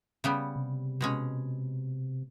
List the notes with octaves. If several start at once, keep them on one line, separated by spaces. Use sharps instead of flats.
C#3 G3 B3
C3
B2 G#3 C#4